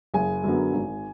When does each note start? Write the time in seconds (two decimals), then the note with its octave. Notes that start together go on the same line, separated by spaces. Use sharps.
0.14 F#1 G#4 G#5
0.44 F#2 D3 F#3 B3
0.73 G#1